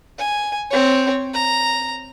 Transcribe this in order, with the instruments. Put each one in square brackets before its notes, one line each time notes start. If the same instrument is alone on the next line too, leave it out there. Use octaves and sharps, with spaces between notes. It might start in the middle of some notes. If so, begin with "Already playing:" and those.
[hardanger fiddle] G#5
C4 C#5
A#5